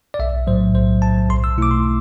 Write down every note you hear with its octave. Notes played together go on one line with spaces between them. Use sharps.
D5
B1 E5
A2 F#3 C5
B1 C5
A2 F#3 A5
B1 C6
E6
B2 A3 E4 D6
C6